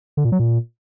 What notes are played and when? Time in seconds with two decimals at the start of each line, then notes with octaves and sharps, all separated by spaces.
0.17 D3
0.25 A#2
0.32 F#3
0.39 A#2